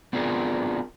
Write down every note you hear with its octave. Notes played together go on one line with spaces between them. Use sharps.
B3 C4 D4 F4 G#4 A#4